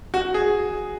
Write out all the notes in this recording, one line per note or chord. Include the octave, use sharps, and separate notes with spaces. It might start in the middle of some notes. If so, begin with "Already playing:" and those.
F#4
G#4